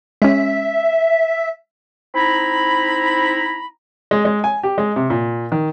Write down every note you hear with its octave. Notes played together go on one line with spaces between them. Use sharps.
G#3 C#4 E5
C4 D#4 E4 A#5 B5
G#3
G#3
G#5
G4
G#3
C3
A#2
D#3